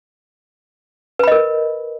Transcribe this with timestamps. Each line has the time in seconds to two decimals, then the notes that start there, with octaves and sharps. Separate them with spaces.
1.19 B4
1.23 B5
1.28 D#5
1.32 A#4